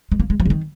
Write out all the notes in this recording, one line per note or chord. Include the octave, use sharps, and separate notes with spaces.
G#3
A#3
G#3
F3
C#3
D#3